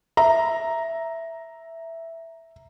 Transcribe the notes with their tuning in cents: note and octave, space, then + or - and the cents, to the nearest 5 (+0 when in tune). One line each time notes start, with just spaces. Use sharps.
E5 +0 A#5 +0